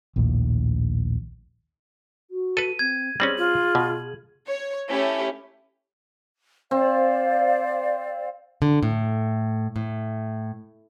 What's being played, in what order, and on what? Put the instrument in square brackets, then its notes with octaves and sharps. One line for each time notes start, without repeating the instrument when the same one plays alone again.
[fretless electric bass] A#1 D#2 A2
[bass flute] F#4
[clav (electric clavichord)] A4 B4 [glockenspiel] D#7
[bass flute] C4 [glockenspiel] G#6
[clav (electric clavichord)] G3 C4 C#4 [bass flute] G#4 [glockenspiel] F#7
[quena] F4
[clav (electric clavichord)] B2
[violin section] C#5
A3 C#4 E4 G4
[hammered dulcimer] C4 [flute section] C5 D5 F5
[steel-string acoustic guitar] D3
A2
A2